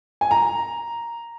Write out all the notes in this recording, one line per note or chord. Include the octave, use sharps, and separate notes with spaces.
G#5
A#5